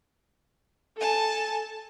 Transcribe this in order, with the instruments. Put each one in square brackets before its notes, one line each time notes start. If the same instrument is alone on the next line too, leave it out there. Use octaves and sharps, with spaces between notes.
[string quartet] A4 G#5 A5